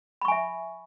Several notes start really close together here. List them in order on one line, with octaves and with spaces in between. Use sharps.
B5 C#6 G#5 E5